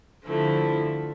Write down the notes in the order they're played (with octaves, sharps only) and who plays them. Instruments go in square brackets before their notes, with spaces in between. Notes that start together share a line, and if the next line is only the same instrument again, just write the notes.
[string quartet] D3 F3 A3 E4